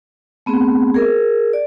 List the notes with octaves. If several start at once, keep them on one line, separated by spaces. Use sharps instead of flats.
A3 B3 C4 G#4
G#4 A#4
D5